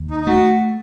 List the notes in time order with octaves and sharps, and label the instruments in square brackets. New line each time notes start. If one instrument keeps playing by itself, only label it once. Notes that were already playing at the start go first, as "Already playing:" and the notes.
Already playing: [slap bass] D#2
[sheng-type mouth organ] D#4
D#4
[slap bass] A3 [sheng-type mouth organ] F#4